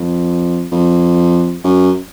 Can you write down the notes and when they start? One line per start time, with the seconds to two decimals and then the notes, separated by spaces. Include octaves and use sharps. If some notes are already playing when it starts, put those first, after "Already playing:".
Already playing: F2
0.72 F2
1.64 F#2